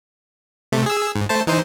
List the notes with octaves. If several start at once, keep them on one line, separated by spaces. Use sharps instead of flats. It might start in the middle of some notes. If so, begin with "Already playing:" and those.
C3 A3
G#4 E6
G#2
A3 C5 A5
E3 D#4 C5